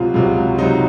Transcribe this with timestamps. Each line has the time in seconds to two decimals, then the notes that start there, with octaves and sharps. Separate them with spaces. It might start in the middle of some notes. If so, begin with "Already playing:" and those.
Already playing: C#2 C3 F#3 F4
0.14 C#2 C3 F#3 F4
0.58 C#2 C3 F#3 D#4